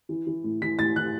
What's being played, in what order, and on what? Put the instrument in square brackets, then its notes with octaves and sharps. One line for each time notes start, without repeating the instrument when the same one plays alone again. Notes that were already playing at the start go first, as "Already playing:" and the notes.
[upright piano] E3
E3
A2
E3 B6
A2 A6
E3 F#6